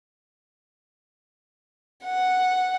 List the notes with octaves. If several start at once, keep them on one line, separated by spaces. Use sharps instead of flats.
F#5